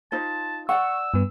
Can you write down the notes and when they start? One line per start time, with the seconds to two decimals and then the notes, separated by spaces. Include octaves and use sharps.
0.12 D#4 F4 C5 A5
0.69 D5 F#5 C#6 E6
1.14 G2 B3